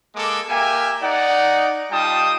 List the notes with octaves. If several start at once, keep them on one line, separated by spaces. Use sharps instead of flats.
G#3 A#3 A4 D6
A#3 G4 E5 G5 G#5
D#4 D5 F#5
G3 D#4 F4 G5 A5 D#6